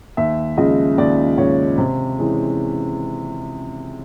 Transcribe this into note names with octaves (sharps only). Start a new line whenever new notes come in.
D#2 E5
C#3 F3 G#3 D#5
D#2 D5
C#3 F3 G#3 C#5
C3 C5
E3 G#3 C#4